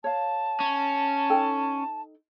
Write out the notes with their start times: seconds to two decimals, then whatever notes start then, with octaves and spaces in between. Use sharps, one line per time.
0.04 C#5 F5 A5
0.60 C#4
1.30 D#4 A4 G5